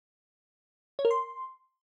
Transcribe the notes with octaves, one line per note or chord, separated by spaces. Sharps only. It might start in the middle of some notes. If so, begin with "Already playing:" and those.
C#5
A#4
C6